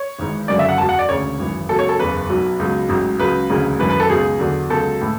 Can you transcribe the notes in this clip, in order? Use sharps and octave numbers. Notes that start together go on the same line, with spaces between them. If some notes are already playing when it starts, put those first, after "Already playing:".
Already playing: C#5
G#1 G#2 E3
F#1 F#2 D3 D5
E5
F#5
E2 B2 F#3 A5
F#5
D5
E1 D2 C#3 C#5
G#1 F#2 E3
C#2 B2 F#3 A4
C#5
A4
F#1 E2 C#3 B4
B1 B2 F#3
C#2 B2 F#3
A1 G#2 F#3
C#2 C#3 F#3 B4
E1 D2 C#3 F#3
G#1 F#2 E3 B4
B4
A4
C#2 B2 F#3 G#4
E2 D3 F#3
C#2 B2 F#3 A4
A2 E3